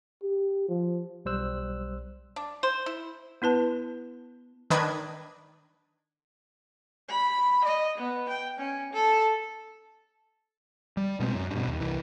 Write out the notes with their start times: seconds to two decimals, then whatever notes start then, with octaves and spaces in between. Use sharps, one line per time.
0.23 G4
0.68 F3
1.25 B1 G3 C5 E6 F#6
2.36 D4
2.63 C5
2.86 E4
3.42 B3 E4 B4 A5
4.70 D#3 D4 B4 D#5 G#6
7.09 B5
7.64 D#5
7.98 B3
8.29 G5
8.59 C#4
8.93 A4
10.97 G3
11.20 B2 G#3 C4
11.34 F#2
11.51 G2 B2
11.68 D#2
11.80 C2 E3